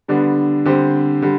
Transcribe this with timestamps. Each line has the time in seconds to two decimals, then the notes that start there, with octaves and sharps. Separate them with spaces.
0.08 D3 G3 B3 D4
0.65 D3 G3 C4 G4 C5
1.22 D3 G3